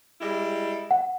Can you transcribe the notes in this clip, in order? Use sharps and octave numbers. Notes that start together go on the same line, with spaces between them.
G3 G#3 E4
F#5